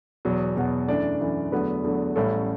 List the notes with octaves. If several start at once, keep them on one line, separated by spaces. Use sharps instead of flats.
E2 B2 F#3
E2 B2 F#3
F#2 E3 A3 D4 D5
F#2 E3 A3 D4
E2 D3 F#3 A3 B3 B4
E2 D3 F#3 A3
A1 A2 G3 A3 C#4 A4